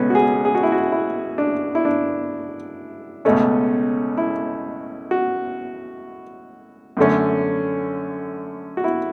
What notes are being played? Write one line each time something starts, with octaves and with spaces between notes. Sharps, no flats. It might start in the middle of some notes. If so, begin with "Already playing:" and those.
Already playing: C#2 B2 A3 C#4 B4
F#4
G#4
G#4
F#4
E4
F#4
E4
D4
E4
D4
C#2 B2 A3 C#4
E4
F#4
F#2 D3 A3 C#4
F#4
E4